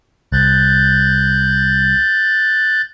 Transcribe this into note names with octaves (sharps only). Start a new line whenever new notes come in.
C2 F#6 G6 A6